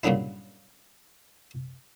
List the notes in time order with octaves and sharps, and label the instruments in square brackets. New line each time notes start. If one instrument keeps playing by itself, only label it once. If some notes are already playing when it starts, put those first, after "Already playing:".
[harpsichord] G2 A#2 C#3 F#3 D4 E4